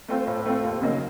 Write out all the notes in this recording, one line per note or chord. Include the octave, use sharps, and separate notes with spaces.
A3 C4 F4 C5
A2
A3 C4 F4 C5
D#2
C#3 F#3 A#3 D#4